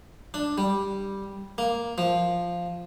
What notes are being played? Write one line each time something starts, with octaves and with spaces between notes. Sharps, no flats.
D4
G3
A#3
F3